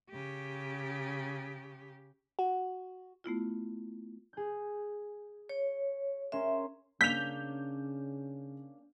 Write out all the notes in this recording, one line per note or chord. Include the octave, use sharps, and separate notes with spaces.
C#3 G4
F#4
A3 B3 E4 F4
G#4 G6
C#5
C#4 A#4 E5 C6
C#3 A#3 C#4 D4 G6 B6 F7